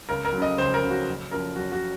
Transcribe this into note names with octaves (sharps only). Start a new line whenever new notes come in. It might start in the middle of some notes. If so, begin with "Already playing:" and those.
C#2 A#4
A#4
F#3
C#3 D#5
C#2 C5
A#4
C#3 F#3
F#4
F#1
F#2 F3 A#4
F#1 F#4
F#4